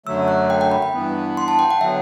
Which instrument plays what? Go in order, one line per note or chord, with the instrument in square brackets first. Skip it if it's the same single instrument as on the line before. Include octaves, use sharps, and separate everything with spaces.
[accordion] F#2 D3 F#3 A3 [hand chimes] E6
[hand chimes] F#6
G5
G5
B5
B5
[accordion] G2 E3 B3
[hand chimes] C6
A5
G5
F#5
[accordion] D3 F#3 B3 [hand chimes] E5